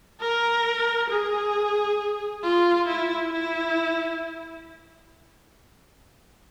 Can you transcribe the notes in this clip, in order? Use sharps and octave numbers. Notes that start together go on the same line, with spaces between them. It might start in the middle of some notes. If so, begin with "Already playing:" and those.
A#4
G#4
F4
E4
E4